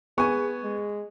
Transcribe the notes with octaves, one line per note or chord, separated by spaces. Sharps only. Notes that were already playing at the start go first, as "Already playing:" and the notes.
B3 G#4 G#5 C#6
G#3